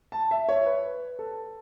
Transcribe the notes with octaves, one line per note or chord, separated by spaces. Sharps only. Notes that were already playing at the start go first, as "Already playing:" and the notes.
A5
E5
C#5
B4
A4